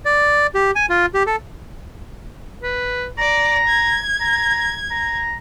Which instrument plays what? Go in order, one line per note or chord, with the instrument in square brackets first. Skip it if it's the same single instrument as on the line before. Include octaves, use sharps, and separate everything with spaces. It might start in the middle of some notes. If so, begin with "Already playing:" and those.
[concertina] D5
G4
G#5
F4
G4
A4
[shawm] B4
[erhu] D5 [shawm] A#5
[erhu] G#6
[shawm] A#5
A#5